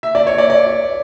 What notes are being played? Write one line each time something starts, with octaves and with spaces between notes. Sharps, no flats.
E5
D5
C#5
D5
D5